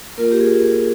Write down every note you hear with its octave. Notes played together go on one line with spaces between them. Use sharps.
A#3 F4 A#4
G4
G#4